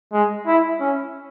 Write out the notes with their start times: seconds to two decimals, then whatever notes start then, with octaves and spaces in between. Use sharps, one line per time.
0.13 G#3
0.47 E4
0.80 C#4